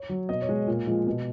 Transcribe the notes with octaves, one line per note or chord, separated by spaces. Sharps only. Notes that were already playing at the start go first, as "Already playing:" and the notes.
Already playing: C#5
F#3
B2 D#5
C#5
G#3
A#2
F3 G#3
B2